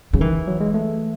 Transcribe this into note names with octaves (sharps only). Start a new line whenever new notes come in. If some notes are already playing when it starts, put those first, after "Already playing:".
C#3 F#3
D#3 E3
F#3
G#3
A3